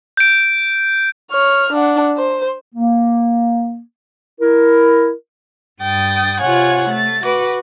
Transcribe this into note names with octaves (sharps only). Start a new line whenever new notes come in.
G6 D7
C#5 F6
D4 F#5
C5
A#3
E4 A#4
G2 G5 D#6 A6
C3 F4 C#5 F#5 G#5
A3 A6
F#4 B4 D6